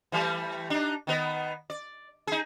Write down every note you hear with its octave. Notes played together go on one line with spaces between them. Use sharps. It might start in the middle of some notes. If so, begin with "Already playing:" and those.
E3 G3 A3
D4 D#4
D#3 B3 D#5
D5
D#4 G#4